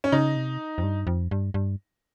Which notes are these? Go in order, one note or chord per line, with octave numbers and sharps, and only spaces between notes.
C#4
C#3 D#4
C3
F2
G2
F2
G2
G2